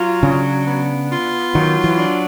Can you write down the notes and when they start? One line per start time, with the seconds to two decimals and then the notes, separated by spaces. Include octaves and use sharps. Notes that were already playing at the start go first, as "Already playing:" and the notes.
Already playing: F#3 F4
0.22 C#3 D4
0.67 B3
1.11 F4
1.55 D#3 F#3
1.84 E3
1.99 D4